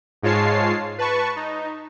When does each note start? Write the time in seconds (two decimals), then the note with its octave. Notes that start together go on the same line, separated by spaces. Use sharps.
0.23 G#2 G#3 F4 C#5 A5 C7
0.98 B4 A5 C#6
1.36 D#4